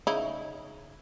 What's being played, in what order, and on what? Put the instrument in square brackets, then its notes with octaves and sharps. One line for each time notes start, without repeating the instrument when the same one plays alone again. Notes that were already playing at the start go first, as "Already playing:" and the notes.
[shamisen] C#3 D#4 E4